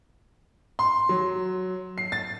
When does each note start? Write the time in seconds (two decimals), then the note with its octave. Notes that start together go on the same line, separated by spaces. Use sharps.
0.79 C6
1.09 F#3
1.98 C7
2.12 A6